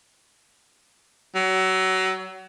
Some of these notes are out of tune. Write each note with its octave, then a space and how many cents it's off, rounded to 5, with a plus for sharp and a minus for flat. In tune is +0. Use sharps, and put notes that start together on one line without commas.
F#3 +25